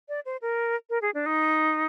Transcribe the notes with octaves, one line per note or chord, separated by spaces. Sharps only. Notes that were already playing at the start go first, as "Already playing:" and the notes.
D5
C5
A#4
A#4
G#4
D4
D#4